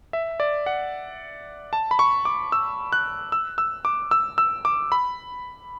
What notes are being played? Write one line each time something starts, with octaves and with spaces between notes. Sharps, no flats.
E5
D5
F#5
A5
B5
C#6
D6
E6
F#6
E6
E6
D6
E6
E6
D6
B5